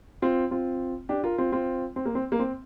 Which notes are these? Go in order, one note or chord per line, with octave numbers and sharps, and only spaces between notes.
C4 F4
C4 F4
D4 G4
F4 A#4
C4 F4
C4 F4
C4
A#3
C4
A#3
C4